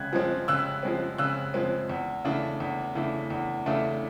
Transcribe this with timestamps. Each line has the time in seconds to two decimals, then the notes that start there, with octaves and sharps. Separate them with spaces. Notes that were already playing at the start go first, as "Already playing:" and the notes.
Already playing: C#3 G#3 F#6 G#6
0.13 F3 G#3 C4
0.48 C#3 E6 F#6
0.83 F3 G#3 C4
1.18 C#3 E6 F#6
1.54 F3 G#3 C4
1.89 E2
2.25 C#3 E3 A3 D4
2.60 E2
2.95 C#3 E3 A3 D4
3.30 E2
3.66 C#3 E3 A3 D4